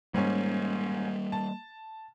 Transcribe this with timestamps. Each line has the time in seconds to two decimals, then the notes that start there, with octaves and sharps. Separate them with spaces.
0.14 G#2 G3 A#3 C#4
1.32 A5